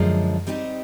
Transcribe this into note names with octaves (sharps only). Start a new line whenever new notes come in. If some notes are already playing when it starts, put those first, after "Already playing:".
Already playing: F#2 D3 F3 G#3
G3 C4 D#4 G4